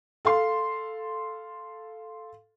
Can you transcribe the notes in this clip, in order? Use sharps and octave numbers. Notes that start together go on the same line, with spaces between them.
A4 F5 C6